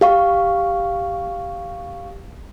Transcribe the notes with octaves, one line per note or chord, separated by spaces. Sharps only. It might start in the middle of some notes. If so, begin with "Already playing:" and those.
G4 F5 C#6